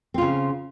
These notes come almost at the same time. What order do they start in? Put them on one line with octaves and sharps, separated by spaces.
C4 F4 C#3